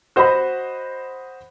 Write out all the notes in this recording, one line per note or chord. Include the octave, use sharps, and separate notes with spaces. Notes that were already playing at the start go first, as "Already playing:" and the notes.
F#4 C5 D#5 F#5 B5